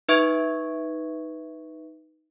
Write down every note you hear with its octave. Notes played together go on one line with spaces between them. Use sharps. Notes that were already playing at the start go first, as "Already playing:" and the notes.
D#4 B4 E5 C#6 G#6 D7